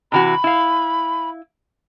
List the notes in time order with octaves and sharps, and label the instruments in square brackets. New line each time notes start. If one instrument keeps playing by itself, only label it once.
[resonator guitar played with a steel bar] C3 E3 F#4 [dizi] B5
[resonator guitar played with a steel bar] E4 F5